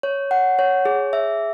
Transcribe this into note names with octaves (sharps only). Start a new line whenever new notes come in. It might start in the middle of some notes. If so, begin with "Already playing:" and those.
C#5
F#5
C#5
G#4
E5